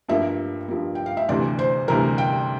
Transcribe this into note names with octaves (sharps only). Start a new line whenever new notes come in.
G2 F3 A#3 E5
G2 F3 A#3
G5
F5
E5
D2 C3 E3 D5
C5
D2 C3 E3 A#4
G5